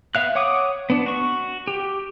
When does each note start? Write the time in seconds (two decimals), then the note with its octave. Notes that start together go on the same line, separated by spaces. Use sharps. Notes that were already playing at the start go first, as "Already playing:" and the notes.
0.15 B3 E5 F5 F#6
0.35 C#5 F#5 D6 D#6
0.90 B3 D4
1.06 F#4 C#6
1.68 G4